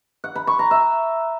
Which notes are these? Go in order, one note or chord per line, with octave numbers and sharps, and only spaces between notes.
F#5
B5
C#6
A#5
E5